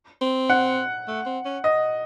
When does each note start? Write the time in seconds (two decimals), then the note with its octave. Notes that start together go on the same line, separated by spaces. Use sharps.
0.22 C4
0.50 F#5
1.07 A3
1.26 C4
1.45 C#4
1.64 D#5